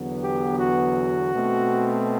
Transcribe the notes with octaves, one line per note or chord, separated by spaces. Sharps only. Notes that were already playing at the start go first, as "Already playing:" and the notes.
Already playing: E2 D3 F#3 B3
G4
F#4
B2 A3 C4